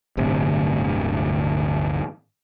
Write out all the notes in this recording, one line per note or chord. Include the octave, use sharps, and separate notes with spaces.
D1 G1 D2 C3